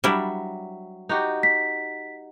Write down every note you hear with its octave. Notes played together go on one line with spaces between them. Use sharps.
F#3 G3 D4 E4 E5
D#4 F#4 G4
B6